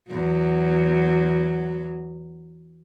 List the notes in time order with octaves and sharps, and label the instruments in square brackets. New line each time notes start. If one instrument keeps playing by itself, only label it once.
[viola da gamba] E2 F#3